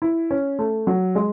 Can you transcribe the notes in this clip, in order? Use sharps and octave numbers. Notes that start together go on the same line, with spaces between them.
E4
C#4
A3
F#3
G#3